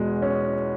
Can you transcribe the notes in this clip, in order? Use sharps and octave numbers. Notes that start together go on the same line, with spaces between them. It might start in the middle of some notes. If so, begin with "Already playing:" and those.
Already playing: E2 B2 G#3
C#4